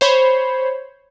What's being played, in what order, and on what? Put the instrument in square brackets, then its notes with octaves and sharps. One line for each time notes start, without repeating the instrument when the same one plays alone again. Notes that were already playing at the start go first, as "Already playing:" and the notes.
[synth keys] C5 C#5 B5